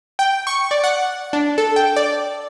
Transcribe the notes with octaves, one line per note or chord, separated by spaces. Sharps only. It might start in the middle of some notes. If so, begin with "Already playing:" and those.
G5
C#6
D5
F#5
D4
A4
G5
D5